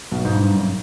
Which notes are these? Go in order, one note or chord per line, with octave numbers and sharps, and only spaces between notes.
B1 B2
G#2
G2
F#2